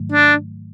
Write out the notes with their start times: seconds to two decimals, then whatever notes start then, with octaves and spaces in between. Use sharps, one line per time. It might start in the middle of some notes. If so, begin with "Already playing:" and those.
Already playing: G#2 D#3 F#3 A3
0.12 D4